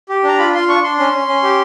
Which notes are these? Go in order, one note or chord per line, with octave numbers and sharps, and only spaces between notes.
G4
D4 A#5
F4 B5
F4 C6
D4 C#6
D4 C6
C#4 C6
C#4
C#4
G4